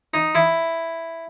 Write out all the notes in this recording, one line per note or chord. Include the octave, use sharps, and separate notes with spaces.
D#4
E4